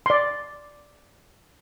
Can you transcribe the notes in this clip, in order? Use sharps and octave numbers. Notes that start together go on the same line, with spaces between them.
D5 C6